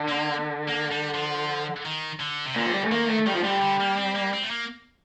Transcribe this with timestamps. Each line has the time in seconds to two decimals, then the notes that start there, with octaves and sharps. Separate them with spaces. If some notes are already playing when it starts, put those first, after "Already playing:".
Already playing: D3
0.08 A#3
0.68 A#3
0.91 G3
1.14 F3
1.86 D#3
2.20 D3
2.46 C3
2.56 A#2 D3
2.66 F3
2.74 G3
2.84 A3
2.92 D#3 A#3
3.10 A3
3.27 D#3 G3
3.35 F3
3.43 D3 G3
3.62 D3
3.80 A#3
3.97 C4
4.16 A#3
4.34 C4
4.44 A3
4.51 A#3